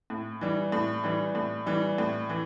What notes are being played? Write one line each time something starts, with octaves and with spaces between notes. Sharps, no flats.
A2
E3 G3
A2
E3 G3
A2
E3 G3
A2
E3